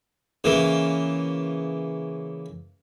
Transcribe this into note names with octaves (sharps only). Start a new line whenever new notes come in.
C#3 E3 A#3